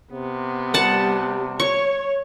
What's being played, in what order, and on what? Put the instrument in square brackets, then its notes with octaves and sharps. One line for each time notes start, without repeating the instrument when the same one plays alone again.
[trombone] C3 [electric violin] B3
[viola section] G3 [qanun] F#5 A5
[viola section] C#5 [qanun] C#6